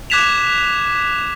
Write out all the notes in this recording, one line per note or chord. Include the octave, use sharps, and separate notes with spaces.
D6 F#6 G#6 B6 E7 F7